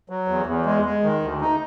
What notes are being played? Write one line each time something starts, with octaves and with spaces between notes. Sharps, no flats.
F#3
E2
E2
G#3
G#3
D#3
D2
D#4